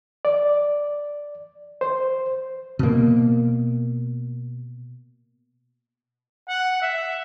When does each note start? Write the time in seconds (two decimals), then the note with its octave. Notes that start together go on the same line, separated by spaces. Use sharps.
0.25 D5
1.81 C5
2.79 B2 A#3
6.49 F#5
6.82 E5